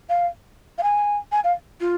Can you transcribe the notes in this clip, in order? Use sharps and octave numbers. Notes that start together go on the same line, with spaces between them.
F5
F5
G#5
G#5
F5
F4